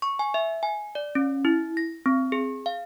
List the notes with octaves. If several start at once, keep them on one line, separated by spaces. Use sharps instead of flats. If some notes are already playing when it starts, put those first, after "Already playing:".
C#6
G#5
E5
G#5
D5
C#4
E4
A#6
C4
G#4
F5